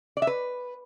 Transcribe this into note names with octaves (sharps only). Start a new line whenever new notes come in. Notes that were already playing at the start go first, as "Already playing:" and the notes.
D5
E5
B4